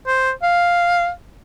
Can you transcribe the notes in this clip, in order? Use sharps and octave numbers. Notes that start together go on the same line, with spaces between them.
C5
F5